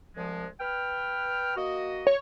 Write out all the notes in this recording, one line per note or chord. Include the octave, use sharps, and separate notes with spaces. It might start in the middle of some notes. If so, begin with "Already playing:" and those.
C2 F3 G#3
B4 G5 F6
A#3 F#4 D#5
C#5